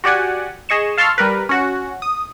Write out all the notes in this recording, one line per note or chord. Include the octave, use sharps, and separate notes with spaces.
F#4 G4 D5 F#5 G#5
G#4 D#5 C#6 E7
F5 A5 C6 C#6 E6 F6
G3 A#4 B4
C#4 F#4 F#5
D#6